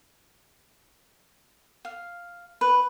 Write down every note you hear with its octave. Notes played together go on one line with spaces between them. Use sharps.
F5
B4